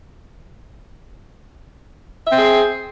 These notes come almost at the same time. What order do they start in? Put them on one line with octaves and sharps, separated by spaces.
E5 C4 G#4